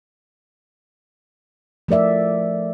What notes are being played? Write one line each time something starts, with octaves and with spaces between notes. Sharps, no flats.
F3 A3 A#4 D5 E5